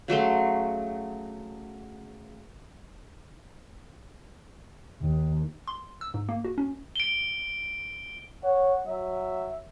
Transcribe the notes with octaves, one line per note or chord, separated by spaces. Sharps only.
C#3 F#3 A3 C6
D#2
C6
E6
G#2
A#3
F#4
C#4
D7 G7
C#5 F#5
F#3 E5